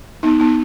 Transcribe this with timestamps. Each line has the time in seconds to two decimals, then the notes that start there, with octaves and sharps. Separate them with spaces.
0.23 B3 D#4
0.40 B3 D#4